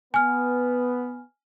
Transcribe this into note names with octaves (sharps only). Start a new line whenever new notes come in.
B3 G#5 F6